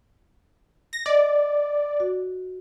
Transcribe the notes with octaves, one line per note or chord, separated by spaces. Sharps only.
A#6
D5 D#5
F#4